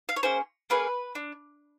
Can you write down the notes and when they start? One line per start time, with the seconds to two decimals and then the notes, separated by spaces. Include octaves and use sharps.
0.09 F5
0.16 C#5
0.23 A#3 C#4 G#4 C5
0.70 A#3 C#4 G#4 B4
1.15 D4